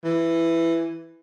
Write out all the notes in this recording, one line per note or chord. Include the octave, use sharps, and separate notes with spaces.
E3